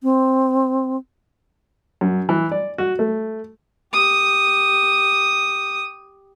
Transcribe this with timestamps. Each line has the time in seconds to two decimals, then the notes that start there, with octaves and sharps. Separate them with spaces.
0.03 C4
2.01 F#2
2.29 E3
2.52 D5
2.78 F#4
2.99 A3
3.93 G4 D#6